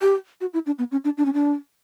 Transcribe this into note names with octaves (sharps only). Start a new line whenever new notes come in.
G4
F#4
E4
D4
B3
C#4
D4
D4
C#4
D4